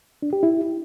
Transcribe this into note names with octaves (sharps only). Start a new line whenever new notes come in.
D4
G4
E4